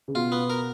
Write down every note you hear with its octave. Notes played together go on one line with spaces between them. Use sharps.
C#3
B2 F4
B3
A#4